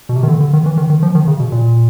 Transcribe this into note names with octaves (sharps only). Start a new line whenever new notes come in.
B2
C3
D#3
D3
D3
D#3
E3
D#3
D#3
F3
D#3
C#3
B2
A#2